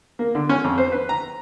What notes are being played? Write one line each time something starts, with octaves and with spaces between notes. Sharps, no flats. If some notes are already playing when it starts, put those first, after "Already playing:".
A#3
D3
C#4
F2
C5
B4
A#5